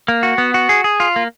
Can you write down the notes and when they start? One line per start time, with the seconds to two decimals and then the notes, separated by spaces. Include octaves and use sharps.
0.08 A#3
0.23 F#4
0.38 B3
0.54 F#4
0.69 G#4
0.84 G#4
1.00 F4
1.16 A#3